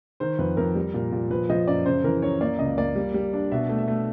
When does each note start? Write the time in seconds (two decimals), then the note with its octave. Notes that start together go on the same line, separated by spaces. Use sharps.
0.20 D#3 C5
0.39 F2 B4
0.57 F2 A#4
0.75 G3
0.94 A#2
1.12 A#2
1.30 F3 B4
1.49 F3 D#5
1.67 F#2 D5
1.86 C#3 C5
2.04 E3 A#4
2.22 F#2 C#5
2.41 A#3 D5
2.59 C#2 D#5
2.78 A#3 D5
2.96 G3
3.14 G3
3.33 D4
3.51 B2 E5
3.69 A3
3.78 E5
3.88 A3